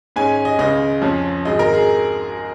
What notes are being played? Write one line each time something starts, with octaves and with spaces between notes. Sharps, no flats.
G#2 G#3 C#4 G#5
D#5
C#2 C#3 G#3 D#5
F2 F3 C#4
G#1 G#2 G#3 D#5
A#4
G#4